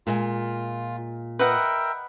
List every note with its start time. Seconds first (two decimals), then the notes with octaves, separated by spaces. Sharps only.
0.07 A#2 G#3 F4
1.39 A#4 B4 D#5 E5 F#5 G5